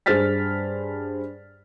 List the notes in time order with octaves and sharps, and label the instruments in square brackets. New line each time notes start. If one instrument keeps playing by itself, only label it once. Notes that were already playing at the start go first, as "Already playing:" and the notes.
[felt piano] G2 G#4 C5 F6 A6 B6